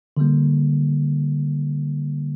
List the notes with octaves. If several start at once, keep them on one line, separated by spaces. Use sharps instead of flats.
D3 G3 A#3